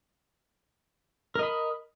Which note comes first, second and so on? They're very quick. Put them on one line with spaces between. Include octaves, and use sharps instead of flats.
A#4 D#5 B5